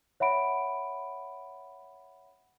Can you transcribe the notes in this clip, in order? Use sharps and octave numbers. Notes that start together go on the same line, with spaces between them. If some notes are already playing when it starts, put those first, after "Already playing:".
C#5 E5 F#5 B5 D7